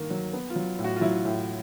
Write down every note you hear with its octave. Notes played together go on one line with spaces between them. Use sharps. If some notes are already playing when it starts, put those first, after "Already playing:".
Already playing: G2 D#3 A#3
F#3
B3
F4
F#3
A2
F#4
F4
F#3 E4
A2